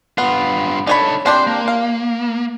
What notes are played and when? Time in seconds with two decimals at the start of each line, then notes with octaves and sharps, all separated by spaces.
0.18 G2 B3 F4
0.87 D4 D#4 A4 C#5 B5
1.26 C4 D4 G4 C5 C6
1.47 A#3
1.68 F5